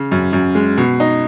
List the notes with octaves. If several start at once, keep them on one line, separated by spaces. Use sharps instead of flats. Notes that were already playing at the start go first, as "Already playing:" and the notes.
Already playing: C#3
F#2
F#2
G#3
B2
D#4